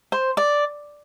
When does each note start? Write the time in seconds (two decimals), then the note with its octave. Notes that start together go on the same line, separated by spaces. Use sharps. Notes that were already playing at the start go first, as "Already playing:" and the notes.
0.12 C5
0.37 D5